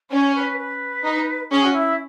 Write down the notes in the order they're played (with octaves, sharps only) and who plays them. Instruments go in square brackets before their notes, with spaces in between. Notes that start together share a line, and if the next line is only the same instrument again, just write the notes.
[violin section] C#4 [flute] C#5
[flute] B4
B4
[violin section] D#4
[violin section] C#4 [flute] G#4
[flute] F#4
E4